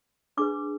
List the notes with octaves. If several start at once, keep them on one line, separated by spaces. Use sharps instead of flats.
D4 G#4 B4 D6